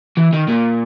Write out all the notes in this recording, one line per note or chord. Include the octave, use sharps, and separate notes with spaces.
E3
D#3
A#2